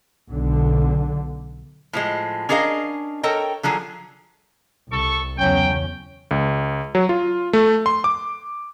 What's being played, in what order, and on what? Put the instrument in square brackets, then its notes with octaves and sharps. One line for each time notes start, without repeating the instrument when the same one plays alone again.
[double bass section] B1 D3
[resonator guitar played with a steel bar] A2 F3 G#3
C#4 D4 G#4 A#4 D#5 F5
A4 A#4 C#5 D#5 G5
D3 F3 F#3 G#4
[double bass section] C2 [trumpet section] A4 C#6
[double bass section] E2 C#3 C#4 [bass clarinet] F#3 [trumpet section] G5
[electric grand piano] C#2
F#3
F4
A3
C6
D6